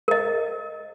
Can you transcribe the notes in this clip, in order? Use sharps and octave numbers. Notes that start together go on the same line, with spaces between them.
A#4 D#5